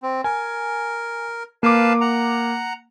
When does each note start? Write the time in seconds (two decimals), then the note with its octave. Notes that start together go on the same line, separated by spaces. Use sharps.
0.03 C4
0.24 A#4 G#5
1.63 A#3 B4 F5 A5 D6
2.01 F#5 A#5